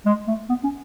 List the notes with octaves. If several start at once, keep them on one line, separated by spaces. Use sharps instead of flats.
G#3
A3
B3
C#4